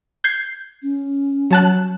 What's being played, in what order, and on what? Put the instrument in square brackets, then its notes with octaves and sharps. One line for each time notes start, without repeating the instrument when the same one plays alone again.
[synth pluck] G6 G#6 C7
[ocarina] C#4
[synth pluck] F#3 A5 F#6